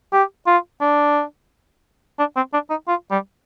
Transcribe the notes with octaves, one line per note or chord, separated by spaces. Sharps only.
G4
F4
D4
D4
C4
D4
D#4
F4
G3